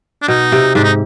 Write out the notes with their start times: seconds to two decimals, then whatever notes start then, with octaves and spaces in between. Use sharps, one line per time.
0.22 D4
0.28 B2 D#4
0.52 C3
0.75 G#2 D4
0.84 D#4